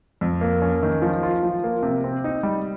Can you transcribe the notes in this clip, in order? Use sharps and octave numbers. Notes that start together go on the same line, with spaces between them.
F2
A#3
C#4
D#3
F3
F4
F3
A#3
C3
C4
D#4
G3